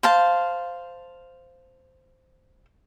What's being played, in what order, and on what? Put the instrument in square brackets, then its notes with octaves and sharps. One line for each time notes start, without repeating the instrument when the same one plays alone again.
[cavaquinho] C5 F5 A5